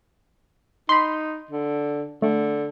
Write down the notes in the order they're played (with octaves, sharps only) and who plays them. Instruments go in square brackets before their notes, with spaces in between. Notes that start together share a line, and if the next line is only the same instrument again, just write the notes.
[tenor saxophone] D#4 [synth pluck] B5 C6
[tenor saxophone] D3
[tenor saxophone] D3 [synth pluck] A3